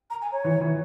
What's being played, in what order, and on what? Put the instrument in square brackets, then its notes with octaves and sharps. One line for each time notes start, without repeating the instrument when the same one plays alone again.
[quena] A#5
G#5
C#5
[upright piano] E3
E3